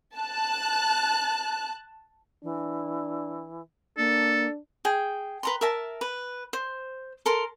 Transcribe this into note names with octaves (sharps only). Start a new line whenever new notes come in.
A5 F#6
E3 D4
A#3 D4 A4
G#4 G5
B4 A#5 C6
A#4 E5 A5
B4
C5
A4 A#4 C6